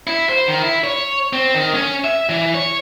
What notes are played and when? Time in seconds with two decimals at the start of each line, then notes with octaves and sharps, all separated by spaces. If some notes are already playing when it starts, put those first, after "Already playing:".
0.07 E4
0.29 C5
0.48 D#3
0.62 E4
0.84 C#5
1.33 C4
1.55 D#3
1.74 C#4
2.04 E5
2.29 E3
2.54 C#5